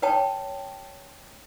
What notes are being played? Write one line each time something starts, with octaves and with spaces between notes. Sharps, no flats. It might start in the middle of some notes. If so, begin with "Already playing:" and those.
B4 C#5 G5 A5